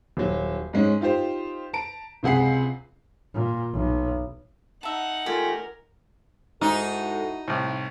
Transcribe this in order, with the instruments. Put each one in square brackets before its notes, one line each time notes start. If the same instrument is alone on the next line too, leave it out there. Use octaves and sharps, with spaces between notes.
[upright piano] D#1 F#3
G#2 G#3 C#4
D#4 F4 G4 C5
A5 A#5 D7
C#2 C3 G#4 F#5 C7
[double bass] A#2
B1
[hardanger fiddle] D#4 F#5 [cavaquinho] E5 A5
[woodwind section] A3 F4 G#5 [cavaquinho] G4 [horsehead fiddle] A#4
[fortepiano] G#2 [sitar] D#4 [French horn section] E4 F#4 A4
[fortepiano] C2 A2